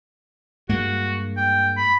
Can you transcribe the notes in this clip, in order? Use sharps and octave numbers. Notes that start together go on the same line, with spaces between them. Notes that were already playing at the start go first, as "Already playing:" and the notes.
G2 G#3 A#3 F#4
G5
B5